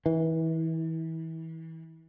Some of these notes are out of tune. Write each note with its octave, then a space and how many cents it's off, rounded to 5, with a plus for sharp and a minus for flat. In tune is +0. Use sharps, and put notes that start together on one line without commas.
E3 -30